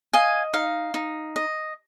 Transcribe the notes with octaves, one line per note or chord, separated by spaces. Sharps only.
D#5 F5 G#5
D#4 F5
D#4
D#5